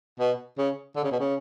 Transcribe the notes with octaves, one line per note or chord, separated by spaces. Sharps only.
B2
C#3
D3
C#3
B2
C#3